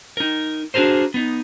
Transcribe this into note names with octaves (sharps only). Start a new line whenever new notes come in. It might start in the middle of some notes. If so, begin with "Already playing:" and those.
D#4 A#4
D4 F#4 G#4 A#4 C5
B3 D#4